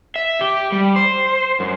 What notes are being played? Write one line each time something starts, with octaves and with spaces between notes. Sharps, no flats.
E5
G4
G3
C5
F#2